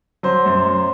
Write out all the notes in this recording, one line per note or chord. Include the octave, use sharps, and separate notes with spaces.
F#3 C5
F#2
F#2